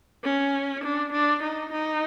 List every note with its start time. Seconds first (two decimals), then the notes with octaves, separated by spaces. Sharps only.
0.24 C#4
0.84 D4
1.12 D4
1.42 D#4
1.72 D#4